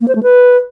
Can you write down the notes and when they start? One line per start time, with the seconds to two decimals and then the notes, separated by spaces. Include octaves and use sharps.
0.01 A#3
0.08 C5
0.15 A3
0.23 B4